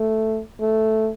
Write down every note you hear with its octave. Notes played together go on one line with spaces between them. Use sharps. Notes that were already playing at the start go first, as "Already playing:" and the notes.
Already playing: A3
A3